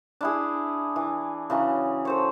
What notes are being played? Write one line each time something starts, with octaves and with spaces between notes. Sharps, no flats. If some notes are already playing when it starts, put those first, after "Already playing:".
D4 E4 G#4
E3
C#3 E3 F#3
A4 C5 C#5